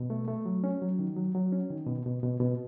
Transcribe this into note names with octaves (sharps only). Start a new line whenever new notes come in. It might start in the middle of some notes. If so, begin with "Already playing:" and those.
Already playing: B2
A3
A3
F#3
C#4
F#3
D#3
F#3
F#3
C#4
D#3
B2
B2
B2
B2